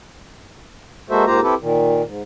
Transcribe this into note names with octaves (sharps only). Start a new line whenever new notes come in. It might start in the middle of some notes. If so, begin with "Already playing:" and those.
G#3 A#3 F#4 A4 C5 E5
G#2 A#3 F4 G4 C5 A#5
C4 E4 G4 A4 B4
A#2 D#3
G#2